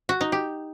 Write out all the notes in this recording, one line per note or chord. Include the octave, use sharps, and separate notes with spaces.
F#4
D#4
G4